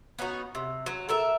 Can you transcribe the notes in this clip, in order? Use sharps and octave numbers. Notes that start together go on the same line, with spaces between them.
B3 C#4 D#4 F#4
C3
F#3
A4 A#4 E5